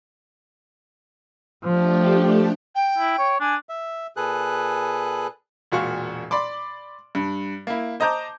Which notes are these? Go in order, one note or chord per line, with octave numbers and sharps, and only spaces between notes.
F3 A3 D4 G4
G5
E4
C#5
D4 G#5
E5
A#2 G#4 A4 B4 F#6
E1 A#2 F#4 F5 C#6
D5 B5 C6 D6
G2
A#3 E4
C5 D#5 A5 A#5 D6 G6